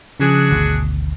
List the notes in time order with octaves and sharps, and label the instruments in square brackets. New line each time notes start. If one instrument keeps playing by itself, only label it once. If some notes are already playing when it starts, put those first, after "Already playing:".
[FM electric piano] C#3 F3 [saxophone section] D4 F#4 G#4
[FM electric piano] G#1 D2 B2